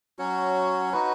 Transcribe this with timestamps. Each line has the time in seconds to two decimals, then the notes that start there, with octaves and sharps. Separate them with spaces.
0.19 F#3 C#4 F#4 C#5
0.93 D#4 F#4 B4